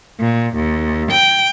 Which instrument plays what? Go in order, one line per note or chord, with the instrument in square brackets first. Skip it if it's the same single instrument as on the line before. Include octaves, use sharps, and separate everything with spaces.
[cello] A#2
D#2
G5